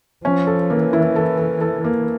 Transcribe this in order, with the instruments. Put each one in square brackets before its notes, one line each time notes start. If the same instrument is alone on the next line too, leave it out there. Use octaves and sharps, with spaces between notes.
[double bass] F3 [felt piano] C#4
[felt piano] A4
[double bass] E3 [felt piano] A#3
[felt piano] E4
A4
A4
A4
A#3